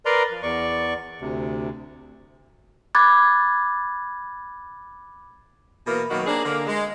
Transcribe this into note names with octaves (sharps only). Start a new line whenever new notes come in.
A#4 B4 D5 A#5 C6
F3
E2 D5 C#6
D2 C3
B5 D6 F#6 G#6 A6
B2 E3 A#3
B2 D#3 F#3 A#3 F#4
A#3 C4 D4 G#4
D3 A#3
G#3